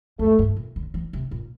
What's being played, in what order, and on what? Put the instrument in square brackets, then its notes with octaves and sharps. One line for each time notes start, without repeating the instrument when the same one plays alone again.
[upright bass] F2 [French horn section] A3
[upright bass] G2
A#2
D3
E3
C3
A#2